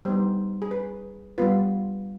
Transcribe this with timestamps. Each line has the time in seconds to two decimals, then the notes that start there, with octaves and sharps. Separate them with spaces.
0.05 G3 B3 D#4 C5
0.62 G#4
0.71 B4
1.38 G3 B3 F4 B4